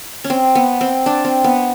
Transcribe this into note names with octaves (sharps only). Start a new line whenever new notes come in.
C#4
C4
B3
C4
D4
C4
B3